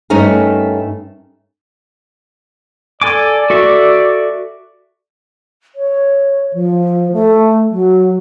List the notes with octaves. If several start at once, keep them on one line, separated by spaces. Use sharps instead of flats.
G2 A3 C#4 D#4 A#4
A4 D5 G#5 D6
F#4 A4 E5
C#5
F3
A3
F#3